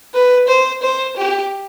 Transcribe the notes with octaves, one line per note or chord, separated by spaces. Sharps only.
B4
C5
C5
G4